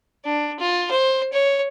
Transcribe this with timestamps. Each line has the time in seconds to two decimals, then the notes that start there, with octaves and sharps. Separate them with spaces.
0.25 D4
0.60 F4
0.91 C5
1.33 C#5